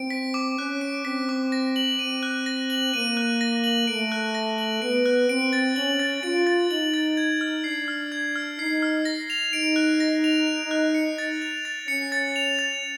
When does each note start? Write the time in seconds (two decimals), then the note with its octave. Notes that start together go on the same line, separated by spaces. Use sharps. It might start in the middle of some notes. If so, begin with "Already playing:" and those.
Already playing: C4 D7
0.10 B6
0.34 D6
0.58 C#4 F#6
0.81 D7
1.05 C4 B6
1.29 D6
1.52 A#6
1.76 F#7
1.99 C4 D#7
2.23 F#6
2.46 A#6
2.70 F#7
2.94 A#3 D#7
3.17 F#6
3.41 A#6
3.64 F#7
3.87 A3 D7
4.12 F#6
4.35 A#6
4.58 F#7
4.82 B3 D7
5.06 F#6
5.29 C4 D7
5.53 A6
5.76 C#4 F#7
6.00 A6
6.23 F4 D7
6.47 A6
6.70 D#4 F#7
6.94 A6
7.17 G#6
7.41 F6
7.64 D4 C7
7.88 F6
8.12 G#6
8.36 F6
8.58 D#4 C7
8.82 F6
9.05 A#6
9.30 F7
9.53 D#4 D7
9.76 F#6
10.00 A#6
10.24 F7
10.47 D7
10.71 F#6
10.95 C#7
11.18 A6
11.42 F7
11.65 A6
11.88 C#4 C#7
12.12 A6
12.36 F7
12.59 A6